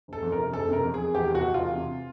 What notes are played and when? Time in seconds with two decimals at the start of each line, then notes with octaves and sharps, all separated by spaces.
0.08 F#1 A4
0.22 F2
0.32 A#4
0.38 C3
0.53 F#1 A4
0.69 C3 A#4
0.83 F2
0.94 G#4
0.99 F2
1.14 E2 G4
1.29 F1
1.35 F#4
1.44 F1
1.54 F4
1.59 E2
1.75 C3